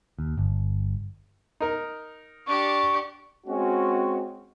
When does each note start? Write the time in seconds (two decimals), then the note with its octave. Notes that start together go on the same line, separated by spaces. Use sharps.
0.19 D#2
0.38 G1
1.60 D#4 A#4
2.46 D4 G4 C#6
3.47 G#3 C4 C#4 F#4